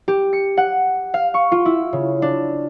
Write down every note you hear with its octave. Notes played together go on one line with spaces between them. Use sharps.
G4
C#7
F#5
F5
C#6
F4
E4
C#3
D4